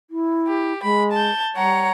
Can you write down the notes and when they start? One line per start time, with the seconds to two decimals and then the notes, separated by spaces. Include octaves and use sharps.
0.10 E4
0.48 G4
0.83 G#3 B5
1.13 A5 G6
1.56 G3 C#5 F#5 A#5